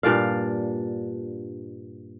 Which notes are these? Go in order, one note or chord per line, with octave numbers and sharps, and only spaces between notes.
G2 A#2 D4 F5